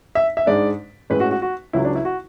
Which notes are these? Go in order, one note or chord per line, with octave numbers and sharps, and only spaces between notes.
E5
E5
G#2 G#3 D4 D5
A2 G#3 C#4 B4
F#4
F#4
F#4
C#2 C#3 F#3 E4
D4
E4
F#4